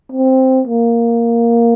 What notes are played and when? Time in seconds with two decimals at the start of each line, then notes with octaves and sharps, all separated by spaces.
0.12 C4
0.67 A#3